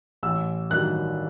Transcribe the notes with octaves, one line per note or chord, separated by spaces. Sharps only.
A1 E6
G2 D#3 F#3 F#6